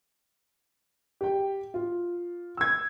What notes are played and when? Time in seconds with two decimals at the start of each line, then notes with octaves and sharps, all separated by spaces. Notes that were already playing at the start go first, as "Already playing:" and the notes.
1.21 G4 G5
1.74 F4
2.57 E6 G#6